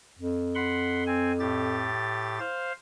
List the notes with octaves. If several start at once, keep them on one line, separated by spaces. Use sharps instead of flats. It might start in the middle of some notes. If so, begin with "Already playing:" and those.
F2
F#5 B5 C6
C4 G#5
A2 G4 A6
C5 F5